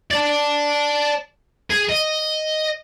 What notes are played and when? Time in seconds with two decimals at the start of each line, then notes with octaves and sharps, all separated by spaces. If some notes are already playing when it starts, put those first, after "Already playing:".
0.11 D5 A5
1.70 G#4
1.89 D#5